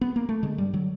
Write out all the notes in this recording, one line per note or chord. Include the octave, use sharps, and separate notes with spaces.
B3
A#3
A3
D3 G#3
G2 G3
D3 F#3